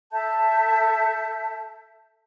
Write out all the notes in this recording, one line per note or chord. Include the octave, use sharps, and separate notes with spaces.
A4 E5 A5 G6